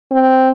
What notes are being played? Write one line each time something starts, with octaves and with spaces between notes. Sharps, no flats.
C4